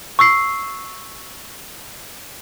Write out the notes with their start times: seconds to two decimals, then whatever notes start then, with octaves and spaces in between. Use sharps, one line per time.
0.19 C#6 E6 C7